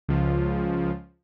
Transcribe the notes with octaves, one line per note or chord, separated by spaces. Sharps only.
C#2 F3